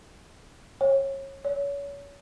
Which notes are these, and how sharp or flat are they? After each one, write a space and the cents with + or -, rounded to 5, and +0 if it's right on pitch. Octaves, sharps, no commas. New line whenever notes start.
C#5 -25
C#5 +35